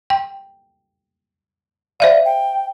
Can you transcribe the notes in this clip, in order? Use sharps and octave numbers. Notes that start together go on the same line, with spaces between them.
G5
C5 D5 E5 F5
G5